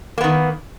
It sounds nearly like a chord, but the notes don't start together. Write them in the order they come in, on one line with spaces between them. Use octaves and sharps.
A#3 B3 D#3